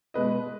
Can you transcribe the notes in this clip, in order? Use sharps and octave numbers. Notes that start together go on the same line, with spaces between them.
B2 G#3 B4 D#5